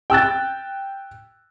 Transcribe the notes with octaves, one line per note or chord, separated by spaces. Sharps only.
G5 E6 F#6 A6